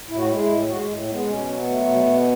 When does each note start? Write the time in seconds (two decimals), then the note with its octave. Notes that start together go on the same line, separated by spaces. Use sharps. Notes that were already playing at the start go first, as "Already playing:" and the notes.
0.09 A2 E4
0.17 F#4
0.26 G#3 E4
0.39 E4
0.48 A2
0.68 G#3 F#4
0.87 A2
1.08 G#3 B3
1.27 B2 C#4
1.46 F#3
1.57 B3
1.67 A3
1.86 B2
2.06 B2